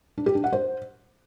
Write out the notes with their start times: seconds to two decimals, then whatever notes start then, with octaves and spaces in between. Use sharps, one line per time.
0.18 D4
0.26 G4
0.35 D4
0.44 F#5
0.52 C5